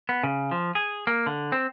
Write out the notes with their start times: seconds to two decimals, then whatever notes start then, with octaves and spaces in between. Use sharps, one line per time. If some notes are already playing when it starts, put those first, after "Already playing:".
0.09 B3
0.23 C#3
0.51 F3
0.75 G#4
1.07 A#3
1.27 D3
1.52 C4